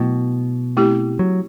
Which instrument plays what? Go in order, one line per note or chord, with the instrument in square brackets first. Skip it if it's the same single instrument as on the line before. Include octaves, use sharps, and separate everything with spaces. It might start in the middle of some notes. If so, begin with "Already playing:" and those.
Already playing: [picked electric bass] B2 [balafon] F#3 A3 E4
[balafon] A3 C4 E4 G4
[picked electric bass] F#3